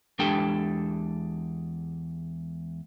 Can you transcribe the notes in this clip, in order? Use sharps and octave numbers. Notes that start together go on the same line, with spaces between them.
E2 G#3 D4 G4 A4 G5